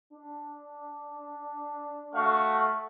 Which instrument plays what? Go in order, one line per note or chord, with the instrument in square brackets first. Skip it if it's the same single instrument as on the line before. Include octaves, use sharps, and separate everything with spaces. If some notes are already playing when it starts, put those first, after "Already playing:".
[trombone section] D4
[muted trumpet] A3 [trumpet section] F#4 F5 C#6